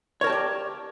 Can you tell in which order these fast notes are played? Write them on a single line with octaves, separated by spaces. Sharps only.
C#5 A#4 A5 G4 D5